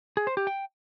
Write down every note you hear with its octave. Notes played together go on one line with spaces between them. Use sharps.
G#4
C5
G4
G5